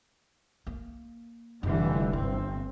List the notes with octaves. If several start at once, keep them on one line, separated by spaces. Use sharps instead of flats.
A#3
F1 D3 E3 G3
G1 D3 C4